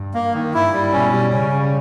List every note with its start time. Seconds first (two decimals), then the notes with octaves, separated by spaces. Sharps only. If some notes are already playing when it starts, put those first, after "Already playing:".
Already playing: G2
0.14 A#3
0.34 D#3
0.53 G2 E4
0.73 G3
0.93 B2 C#4
1.12 G3
1.32 C#3 C#4
1.52 G3